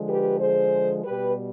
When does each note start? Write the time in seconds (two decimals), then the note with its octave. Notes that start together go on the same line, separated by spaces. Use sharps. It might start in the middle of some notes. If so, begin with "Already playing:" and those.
Already playing: D3 F3 G#3
0.09 G4 B4
0.41 G#4 C5
1.04 B2 G3 G4 B4